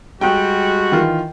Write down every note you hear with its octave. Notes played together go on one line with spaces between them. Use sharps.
G3 G#3 F#4 G5
D#3 E3 F4